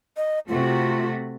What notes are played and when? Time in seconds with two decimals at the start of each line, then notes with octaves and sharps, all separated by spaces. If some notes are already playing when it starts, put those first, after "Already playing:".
0.17 D#5
0.48 C3 A3 F4 F#4